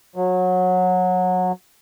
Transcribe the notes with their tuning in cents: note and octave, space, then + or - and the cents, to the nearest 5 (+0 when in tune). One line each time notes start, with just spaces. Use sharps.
F#3 -20